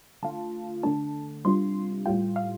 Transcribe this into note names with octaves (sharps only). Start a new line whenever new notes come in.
D3 A3 F4 A5
D3 A3 D4 A5
C3 G3 D4 F4 C6
A2 G3 F4 G5
F5